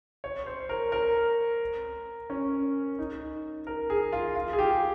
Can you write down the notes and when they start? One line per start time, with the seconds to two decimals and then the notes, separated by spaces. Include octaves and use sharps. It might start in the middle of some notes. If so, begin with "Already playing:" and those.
0.24 C#5
0.46 C5
0.69 A#4
0.92 A#4
2.30 C#4
2.99 D#4
3.67 A#4
3.90 G#4
4.12 F4
4.35 F4
4.53 G#4
4.59 G4